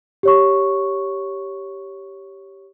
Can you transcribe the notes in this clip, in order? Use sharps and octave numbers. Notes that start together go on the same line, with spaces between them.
G4 C#5 C#6